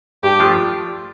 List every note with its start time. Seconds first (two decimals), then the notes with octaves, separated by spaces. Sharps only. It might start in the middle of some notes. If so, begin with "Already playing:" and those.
0.23 G2 G4
0.40 F3 A3 D4 F4